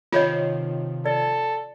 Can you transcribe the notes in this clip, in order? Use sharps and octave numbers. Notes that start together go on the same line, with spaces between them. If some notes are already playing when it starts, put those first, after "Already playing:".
C3 D#3 F3 F4 C#5 D#5
A4 D5